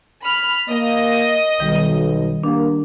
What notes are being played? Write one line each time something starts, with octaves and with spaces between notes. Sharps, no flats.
B5 F6
A#3 D#5
B1 D#3 G3
A#3 D4 G4